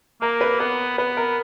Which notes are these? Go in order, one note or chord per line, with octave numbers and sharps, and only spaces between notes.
A#3 A#4
B4
B3 B4
B3 B4
A#4